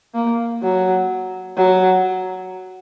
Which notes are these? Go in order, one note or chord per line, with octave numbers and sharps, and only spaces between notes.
A#3
F#3
F#3